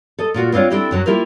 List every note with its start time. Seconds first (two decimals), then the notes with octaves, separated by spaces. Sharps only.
0.19 A4 D#5
0.34 A#2 F4 F#4
0.52 B3 C4 D4 F4 C#5
0.70 C4 D4 E4 G4 A4
0.91 F#2 F#3
1.06 A#3 E4 F4 G4 A#4